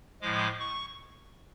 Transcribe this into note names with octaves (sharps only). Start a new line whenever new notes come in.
A2 F3 G#3 D6
C#6